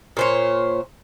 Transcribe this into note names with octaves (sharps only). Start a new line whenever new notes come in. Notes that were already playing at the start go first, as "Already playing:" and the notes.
A#2 C5 C#5